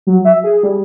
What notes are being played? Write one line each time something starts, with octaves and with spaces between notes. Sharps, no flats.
F#3
E5
G#4
G3